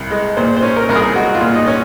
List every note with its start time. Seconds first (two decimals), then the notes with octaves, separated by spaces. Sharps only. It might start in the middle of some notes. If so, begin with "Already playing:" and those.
Already playing: C2
0.11 G#3
0.37 A#2 C5
0.56 C5
0.63 C#4
0.77 A#4
0.89 C2 A#4
0.96 G#4
1.15 G#3 F#4
1.35 F4
1.41 A#2
1.55 D#4
1.67 C#4